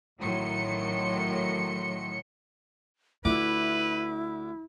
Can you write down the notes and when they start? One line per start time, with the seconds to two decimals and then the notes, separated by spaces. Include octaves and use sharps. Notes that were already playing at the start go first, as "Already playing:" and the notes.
0.20 A1 A2 D#3 F#3 C6 C#7
3.25 D2 E4 F4 B4 D6